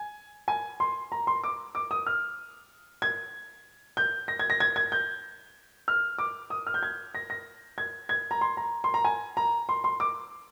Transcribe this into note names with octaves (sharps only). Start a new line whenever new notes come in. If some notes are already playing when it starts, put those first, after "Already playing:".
Already playing: G#5
G#5
C6
A#5
C6
D6
D6
D#6
F6
G#6
G6
A#6
G#6
A#6
G#6
G#6
G6
F6
D6
D#6
F6
G6
G#6
A#6
A#6
G#6
G#6
A#5
C6
A#5
C6
A#5
G#5
A#5
C6
C6
D6